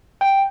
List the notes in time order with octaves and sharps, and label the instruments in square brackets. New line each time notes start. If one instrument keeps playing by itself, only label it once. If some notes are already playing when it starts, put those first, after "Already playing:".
[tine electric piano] G5